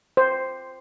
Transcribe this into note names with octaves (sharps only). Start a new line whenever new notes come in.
C5